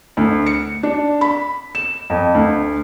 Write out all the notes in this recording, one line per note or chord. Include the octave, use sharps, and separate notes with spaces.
D2
C#7
D4
B5
E7
F2
D2